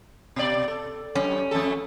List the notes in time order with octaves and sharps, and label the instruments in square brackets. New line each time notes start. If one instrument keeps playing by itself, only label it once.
[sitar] B2 D5
A4
[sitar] F#2 [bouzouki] C#4
[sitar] F2 A3 A4